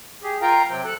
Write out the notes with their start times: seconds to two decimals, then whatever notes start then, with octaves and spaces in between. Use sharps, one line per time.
0.23 G4 G#4
0.42 F4 A#4 F5 G5 A#5
0.69 C3 F#3 C4 G5
0.84 D#2 A4 F#6